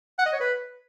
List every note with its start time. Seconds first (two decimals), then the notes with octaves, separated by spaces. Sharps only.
0.19 F#5
0.26 D#5
0.33 C#5
0.40 B4